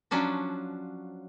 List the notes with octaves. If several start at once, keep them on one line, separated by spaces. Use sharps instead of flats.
F3 F#3 C#4 D4 F#4